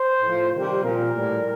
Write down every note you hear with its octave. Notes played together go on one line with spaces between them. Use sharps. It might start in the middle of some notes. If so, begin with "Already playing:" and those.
Already playing: C5
A2 F3
C3 D#3 G3 C5
A#2 F3 A#4
A2 G3